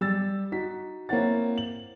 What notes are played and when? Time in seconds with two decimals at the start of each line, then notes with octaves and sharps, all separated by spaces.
0.01 G3 E6 A6
0.52 D#4 F#4 B6
1.09 A#3 C4 E4 C#5 F#5 A6
1.58 F#7